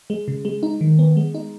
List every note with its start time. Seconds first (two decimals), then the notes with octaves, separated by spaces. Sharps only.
0.10 G#3
0.28 C#3
0.45 G#3
0.63 D#4
0.81 D#3
0.99 B3
1.17 G#3
1.35 D#4